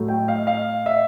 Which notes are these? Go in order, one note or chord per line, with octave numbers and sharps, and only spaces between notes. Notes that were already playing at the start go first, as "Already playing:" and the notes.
Already playing: A2 F#3 A3
G5
F5
F5
E5